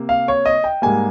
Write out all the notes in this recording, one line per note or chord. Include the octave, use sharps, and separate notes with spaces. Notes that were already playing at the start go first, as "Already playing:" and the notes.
Already playing: C3 A#3
F5
C#5
D#5
G5
G#2 G3 A#3 G#5